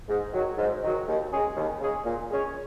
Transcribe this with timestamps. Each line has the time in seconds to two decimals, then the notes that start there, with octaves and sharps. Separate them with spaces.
0.08 G#2
0.33 D#3 F#3
0.58 G#2
0.83 D#3 F#3
1.07 D#2
1.31 C#3 G#3 C#4 G#4
1.56 D#2
1.80 C#3 G#3 C#4 G#4
2.05 A#2
2.30 G#3 C#4 G#4 C#5